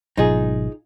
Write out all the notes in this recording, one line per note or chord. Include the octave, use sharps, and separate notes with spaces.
G#1 B2 F#3 D#4 F4 G#4